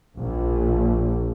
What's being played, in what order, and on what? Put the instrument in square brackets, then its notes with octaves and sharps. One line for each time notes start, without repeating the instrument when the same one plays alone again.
[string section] A#1